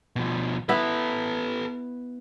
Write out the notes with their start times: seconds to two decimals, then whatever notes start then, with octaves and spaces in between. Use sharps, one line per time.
0.16 B2 F3
0.69 B3 E4 A4 B4